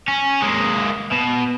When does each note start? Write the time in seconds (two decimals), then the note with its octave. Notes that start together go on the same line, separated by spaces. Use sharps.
0.08 C#4
0.42 G#3 A#3
1.12 B2